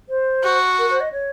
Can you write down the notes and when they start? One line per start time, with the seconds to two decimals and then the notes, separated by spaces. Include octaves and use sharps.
0.09 C5
0.43 F#4
0.78 A#4
0.90 C5
1.01 D#5
1.12 C#5